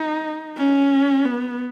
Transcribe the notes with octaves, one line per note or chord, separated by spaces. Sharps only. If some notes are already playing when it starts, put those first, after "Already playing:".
Already playing: D#4
C#4
B3